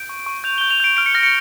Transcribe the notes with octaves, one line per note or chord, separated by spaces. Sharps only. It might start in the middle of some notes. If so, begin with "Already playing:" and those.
Already playing: G6 D7
C#6
C#6
G6 F7
G6 G7
F7
G6 D7
F6 D7
C#7
F6 A#6
C#7